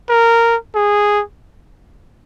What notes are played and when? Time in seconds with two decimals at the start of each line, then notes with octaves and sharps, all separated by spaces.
0.09 A#4
0.75 G#4